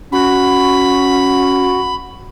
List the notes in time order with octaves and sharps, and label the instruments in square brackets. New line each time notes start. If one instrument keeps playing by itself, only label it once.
[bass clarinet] C#4 [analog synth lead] F#4 [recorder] B5